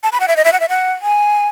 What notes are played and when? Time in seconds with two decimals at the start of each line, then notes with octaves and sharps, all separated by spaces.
0.03 A5
0.12 B5
0.20 F#5
0.28 E5
0.37 D#5
0.44 E5
0.53 F#5
0.60 E5
0.69 F#5
1.02 G#5